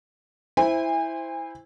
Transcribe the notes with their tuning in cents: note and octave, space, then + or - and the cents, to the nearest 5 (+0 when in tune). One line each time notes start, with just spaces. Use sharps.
E4 +0 C5 -5 G#5 -35